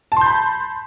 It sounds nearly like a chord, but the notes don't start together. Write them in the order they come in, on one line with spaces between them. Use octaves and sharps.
A5 C6 G6 B5